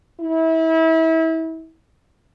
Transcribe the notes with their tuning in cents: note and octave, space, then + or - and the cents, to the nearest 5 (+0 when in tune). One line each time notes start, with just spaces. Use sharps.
E4 -30